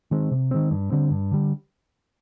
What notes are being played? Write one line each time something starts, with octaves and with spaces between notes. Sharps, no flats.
D#3 G#3 C4
C3
D#3 G#3 C4
G2
D3 G3 C4
G2
D3 G3